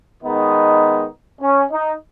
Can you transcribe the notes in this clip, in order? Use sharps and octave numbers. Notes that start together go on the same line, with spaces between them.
D#3 G#3 B3 D#4
C#4
D#4